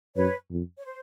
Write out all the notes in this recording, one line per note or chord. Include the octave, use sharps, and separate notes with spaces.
F#2 B4 C#5
F2
C#5
C5